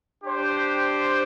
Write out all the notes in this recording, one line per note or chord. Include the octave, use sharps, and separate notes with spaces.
D4 G4 C5 G5